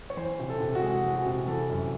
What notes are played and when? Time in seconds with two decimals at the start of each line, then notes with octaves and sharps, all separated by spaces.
0.10 C#5
0.17 E3 C5
0.39 C3
0.50 A4
0.60 C3
0.75 F#4
0.82 G#3 G#4
1.04 E3
1.15 F#4
1.26 C3
1.47 E3 A4
1.70 F#2